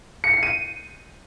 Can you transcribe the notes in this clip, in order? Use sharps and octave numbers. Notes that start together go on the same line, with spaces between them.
C#7
C7
D#7